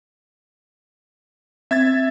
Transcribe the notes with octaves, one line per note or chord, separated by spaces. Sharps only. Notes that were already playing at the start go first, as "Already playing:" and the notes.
C4 E5 G#6 A6